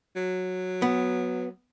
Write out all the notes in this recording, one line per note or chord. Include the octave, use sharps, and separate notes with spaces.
F#3
B3